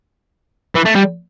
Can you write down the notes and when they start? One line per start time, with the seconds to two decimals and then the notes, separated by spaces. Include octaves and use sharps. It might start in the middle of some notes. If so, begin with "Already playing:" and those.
0.75 E3
0.85 A3
0.95 G3